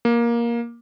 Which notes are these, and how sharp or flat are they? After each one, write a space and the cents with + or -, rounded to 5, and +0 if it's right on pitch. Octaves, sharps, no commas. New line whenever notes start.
A#3 +15